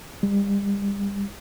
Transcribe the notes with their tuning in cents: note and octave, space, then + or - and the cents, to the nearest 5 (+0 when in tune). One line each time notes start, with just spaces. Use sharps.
G3 +35